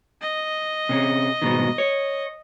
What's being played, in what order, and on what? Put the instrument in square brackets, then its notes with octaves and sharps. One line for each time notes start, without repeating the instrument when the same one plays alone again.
[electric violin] D#5
[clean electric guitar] C3 C#4
G#2 B2 D#3
C#5